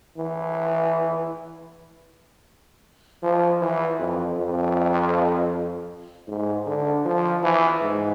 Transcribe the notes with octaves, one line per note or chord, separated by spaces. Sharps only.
E3
F3
E3
F2
F2
G#2
D3
F3
E3
G#2